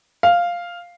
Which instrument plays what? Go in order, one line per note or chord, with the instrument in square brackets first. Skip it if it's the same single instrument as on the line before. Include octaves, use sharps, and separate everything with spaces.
[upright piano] F5